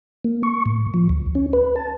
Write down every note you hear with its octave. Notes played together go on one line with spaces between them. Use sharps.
A#3
C#6
A2
F3
D2
C#4
B4
A5